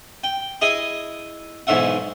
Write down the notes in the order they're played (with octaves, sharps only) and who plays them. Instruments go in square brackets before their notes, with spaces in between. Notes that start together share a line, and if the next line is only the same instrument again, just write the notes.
[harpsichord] G5
E4 G#4 D#5
B1 G#2 E3 E5 F#5